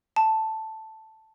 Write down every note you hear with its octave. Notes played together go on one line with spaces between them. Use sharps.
A5